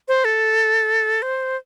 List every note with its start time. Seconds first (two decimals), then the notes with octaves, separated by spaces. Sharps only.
0.08 C5
0.25 A4
1.22 C5